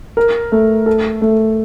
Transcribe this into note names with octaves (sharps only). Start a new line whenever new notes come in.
A#4
A3
A4
A3